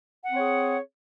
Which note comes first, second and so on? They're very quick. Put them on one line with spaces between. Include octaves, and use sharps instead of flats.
F#5 C4 C#5 G#4